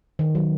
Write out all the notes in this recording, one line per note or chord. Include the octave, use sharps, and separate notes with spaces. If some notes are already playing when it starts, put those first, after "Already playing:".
D#3
F#3